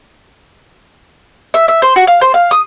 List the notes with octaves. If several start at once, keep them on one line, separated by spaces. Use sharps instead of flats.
E5
E5
C5
F#4
F5
C5
F5
D#6